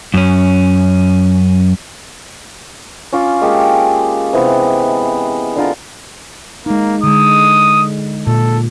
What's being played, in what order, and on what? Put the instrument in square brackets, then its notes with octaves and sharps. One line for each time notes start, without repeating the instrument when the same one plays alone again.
[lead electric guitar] F#2 C#4
[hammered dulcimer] C#4 F4 D6
G#3 A#3 G4 A4
C3 E3 B3
D3 F4 A#4
[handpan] G#3 D#4 [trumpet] A#3
[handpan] D3 G#3 [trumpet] D#6
[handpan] A#2 [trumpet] A4